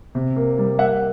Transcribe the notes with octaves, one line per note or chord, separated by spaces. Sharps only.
C3
A#3
G3
A#3 E5 F#5